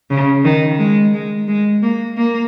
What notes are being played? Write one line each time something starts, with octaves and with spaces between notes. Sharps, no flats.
C#3
D#3
G#3
G#3
G#3
A#3
A#3